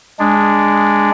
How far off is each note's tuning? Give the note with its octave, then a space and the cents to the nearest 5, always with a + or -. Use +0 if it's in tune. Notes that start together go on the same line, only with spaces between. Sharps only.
G#3 -10 D4 +0